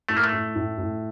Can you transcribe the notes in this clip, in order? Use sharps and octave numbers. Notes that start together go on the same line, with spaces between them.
A2 A3
A#3
A3
A2
A2
A2